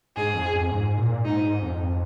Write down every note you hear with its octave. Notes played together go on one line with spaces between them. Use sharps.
G#2 G#4
F2
F2
G#2
A#2
G#2 D#4
G#2
F2